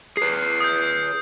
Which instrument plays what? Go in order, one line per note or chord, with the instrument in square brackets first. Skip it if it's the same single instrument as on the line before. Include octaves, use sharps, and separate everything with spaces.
[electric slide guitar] G#4 B4 [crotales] C7
[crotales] D#6 G6